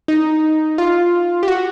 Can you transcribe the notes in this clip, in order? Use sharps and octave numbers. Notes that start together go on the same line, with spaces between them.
D#4
F4
G4
F#4